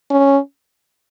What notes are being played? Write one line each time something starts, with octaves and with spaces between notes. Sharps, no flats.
C#4